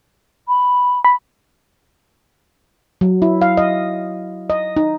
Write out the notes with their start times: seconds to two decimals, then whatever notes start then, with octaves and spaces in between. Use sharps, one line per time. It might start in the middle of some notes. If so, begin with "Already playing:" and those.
0.48 B5
1.05 B5
3.01 F#3
3.22 E4
3.42 F5
3.57 D#5
4.50 D#5
4.77 D#4